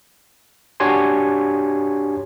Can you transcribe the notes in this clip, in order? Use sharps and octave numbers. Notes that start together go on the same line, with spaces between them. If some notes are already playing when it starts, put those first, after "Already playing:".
D4 F#4 G4 C#5 G#5 C6